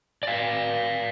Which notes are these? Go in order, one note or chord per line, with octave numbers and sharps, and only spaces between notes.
D5 F5